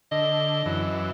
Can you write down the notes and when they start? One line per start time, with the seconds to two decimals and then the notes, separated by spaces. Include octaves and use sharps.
0.11 D3 D#5
0.66 F#2 E3